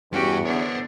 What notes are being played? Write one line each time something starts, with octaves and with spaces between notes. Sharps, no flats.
E2 G2 C#4 F#4 G4 G5
D3 B3 D4 C5 C#5